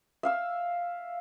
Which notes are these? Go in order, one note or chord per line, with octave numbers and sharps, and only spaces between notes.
E5 F5 E6